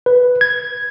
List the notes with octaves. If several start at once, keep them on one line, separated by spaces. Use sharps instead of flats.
B4
G#6